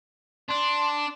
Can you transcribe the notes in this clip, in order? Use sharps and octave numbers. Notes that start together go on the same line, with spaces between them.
D4 C6